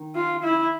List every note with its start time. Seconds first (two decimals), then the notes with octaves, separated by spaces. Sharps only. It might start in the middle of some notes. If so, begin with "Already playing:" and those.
Already playing: D#3
0.15 F4
0.43 E4